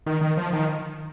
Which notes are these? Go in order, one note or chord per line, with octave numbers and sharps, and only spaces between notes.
D#3
D#3
F3
D#3